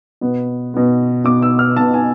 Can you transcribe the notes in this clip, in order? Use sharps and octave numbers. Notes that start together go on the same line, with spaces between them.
B2 B3
B2 B3
B2 B3 D6
E6
F6
B2 B3 A5
G#5